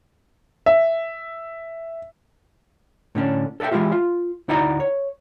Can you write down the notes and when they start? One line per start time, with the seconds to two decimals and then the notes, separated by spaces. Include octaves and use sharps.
0.66 E5
3.15 A2 D3 C#4 D4
3.60 A4 A#4 D#5 E5 G5
3.71 E3 G#3 C#4 E4 F4 G4
3.92 F4
4.48 D2 D#4 E4 F#4 D5 A#5
4.80 C#5